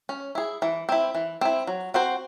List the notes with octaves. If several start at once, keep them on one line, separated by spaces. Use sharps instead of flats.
C#4
E4 G#4
E3
C4 E4
E3
C4 E4
F#3
C4 F#4 C5